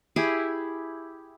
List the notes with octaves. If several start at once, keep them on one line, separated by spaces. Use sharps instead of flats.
E4 G4 G#4